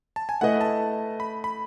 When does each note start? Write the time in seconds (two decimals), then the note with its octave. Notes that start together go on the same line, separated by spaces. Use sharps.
0.16 A5
0.29 G#5
0.41 A3 E4 B4 D#5 F#5
0.61 A5
1.20 B5
1.44 B5